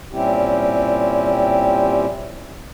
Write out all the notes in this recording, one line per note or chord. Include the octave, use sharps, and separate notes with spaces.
A#2 G3 C4 C#4 E4 G4